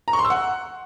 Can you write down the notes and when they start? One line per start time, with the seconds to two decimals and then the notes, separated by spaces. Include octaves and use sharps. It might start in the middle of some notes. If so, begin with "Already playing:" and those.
0.08 A#5
0.13 C#6
0.19 C6
0.25 E6
0.30 F#5